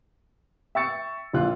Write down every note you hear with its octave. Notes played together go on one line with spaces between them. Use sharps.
E5 G5 C#6 E6 A6 C#7
A#1 A#2 F4 F#6